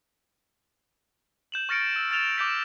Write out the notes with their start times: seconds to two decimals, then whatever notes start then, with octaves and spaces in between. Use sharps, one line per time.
1.52 G6 E7 F#7
1.69 C#6 F6 A6 A#6 C#7 D7
1.96 E6
2.11 F6 A6 E7 F7 G7
2.36 D6 G6 B6 D7